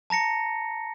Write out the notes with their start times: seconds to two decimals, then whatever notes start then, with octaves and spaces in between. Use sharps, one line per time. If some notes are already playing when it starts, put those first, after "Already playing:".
0.10 A5 A#5 A#6 C#7